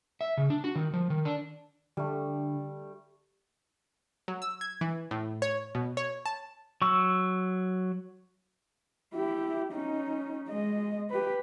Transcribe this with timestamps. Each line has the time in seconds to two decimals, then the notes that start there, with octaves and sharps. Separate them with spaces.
0.21 E5
0.37 C#3
0.50 D4
0.64 F#4
0.75 D#3
0.94 F3
1.10 D#3
1.25 D4
1.97 D3 G3 A3
4.28 F#3
4.42 E6
4.61 G#6
4.81 E3
5.11 A2
5.42 C#5
5.75 B2
5.97 C#5
6.26 A5
6.82 F#3 C#6 E6
9.14 E4 G4
9.73 C#4 D#4
10.49 G#3 D#5
11.10 G4 B4